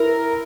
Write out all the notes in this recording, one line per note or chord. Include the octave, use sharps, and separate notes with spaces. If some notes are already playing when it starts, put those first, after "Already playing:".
Already playing: E4 A#4